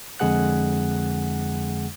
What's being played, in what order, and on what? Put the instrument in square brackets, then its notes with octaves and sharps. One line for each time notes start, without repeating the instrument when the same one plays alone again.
[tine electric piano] F2 D3 G#3 G#4 F#5 F#6